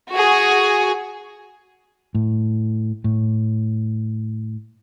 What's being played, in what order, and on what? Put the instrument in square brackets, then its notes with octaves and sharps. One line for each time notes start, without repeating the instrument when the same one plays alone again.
[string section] F#4 G#4
[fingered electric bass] A2
A2